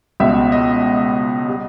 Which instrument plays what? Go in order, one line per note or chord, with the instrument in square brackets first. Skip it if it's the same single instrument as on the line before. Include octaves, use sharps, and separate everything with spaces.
[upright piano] C#2 B2 G3 E5
D#5
G3